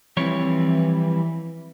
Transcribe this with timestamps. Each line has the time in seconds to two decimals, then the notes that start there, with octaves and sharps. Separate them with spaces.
0.17 E3 F3 G3 C4 C#5